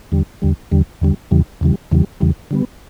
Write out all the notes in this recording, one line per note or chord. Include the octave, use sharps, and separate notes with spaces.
E2 D3 G3
E2 D3 G3
E2 D3 G3
E2 D3 G3
E2 C#3 E3 G3
E2 C#3 E3 G3
E2 C#3 E3 G3
E2 C#3 E3 G3
D3 G3 B3